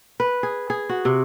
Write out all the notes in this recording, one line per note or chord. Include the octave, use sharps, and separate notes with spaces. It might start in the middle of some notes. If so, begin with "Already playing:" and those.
B4
G#4
G#4
F#4
C3